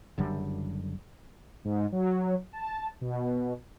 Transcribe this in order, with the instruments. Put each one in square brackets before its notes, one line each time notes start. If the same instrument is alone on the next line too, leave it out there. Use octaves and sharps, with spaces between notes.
[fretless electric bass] F#1 F#2 D3 G3
[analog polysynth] G#2
F#3
A5
B2